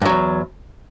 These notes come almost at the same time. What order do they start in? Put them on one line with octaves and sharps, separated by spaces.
G2 F#3 E2